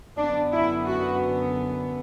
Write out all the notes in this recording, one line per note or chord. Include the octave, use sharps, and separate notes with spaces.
F#2 D3 B3 D4
E4
F#4